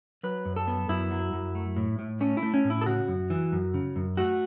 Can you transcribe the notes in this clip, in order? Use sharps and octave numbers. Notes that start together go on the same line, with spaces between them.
F#3 B4
F#2
A4
B3
F#2 E4
F#3
F#2
A3
A2
A2
A3 C#4
E4
A3
C#4
A2
E4
A4
C#3 F#4
F#2
E3
F#2
C#3
F#2
A3 F#4